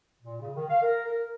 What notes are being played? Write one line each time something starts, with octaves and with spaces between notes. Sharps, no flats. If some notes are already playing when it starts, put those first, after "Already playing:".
A#2
C#3
D#3
F5
A#4
A#4